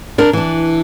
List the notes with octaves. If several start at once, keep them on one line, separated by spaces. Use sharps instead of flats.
D4 A#4
E3 D4